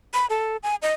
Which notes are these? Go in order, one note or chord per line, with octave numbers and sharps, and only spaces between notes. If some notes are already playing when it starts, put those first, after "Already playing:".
B5
A4
G#5
D#5